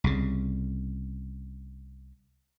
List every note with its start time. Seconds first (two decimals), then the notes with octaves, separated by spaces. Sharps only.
0.04 C2 C#3